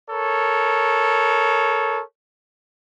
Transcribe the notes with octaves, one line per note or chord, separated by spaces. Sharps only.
A4 A#4 C#5